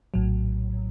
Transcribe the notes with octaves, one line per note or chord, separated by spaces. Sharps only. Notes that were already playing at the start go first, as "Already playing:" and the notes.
A#1 A2 F#3